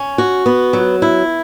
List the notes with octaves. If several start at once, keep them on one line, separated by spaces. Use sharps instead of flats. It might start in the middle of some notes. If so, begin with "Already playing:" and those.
Already playing: C#4
F#4
B3
F#3
E4